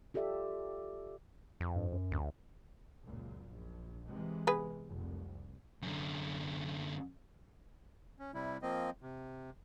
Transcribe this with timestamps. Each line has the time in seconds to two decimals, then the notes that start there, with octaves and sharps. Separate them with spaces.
0.14 F4 G4 A4 D5 E5
1.60 F2
1.76 G2
1.92 F#2
2.11 D2
3.03 C#2 F#2 A#2
3.49 A#1
4.08 C3 E3 G#3
4.47 B3 G#4 B4
4.89 F1 C2
5.83 F#2 D3
8.19 C#4
8.34 C3 G3 E4
8.62 F3 A#3 C4 D#5
9.02 C3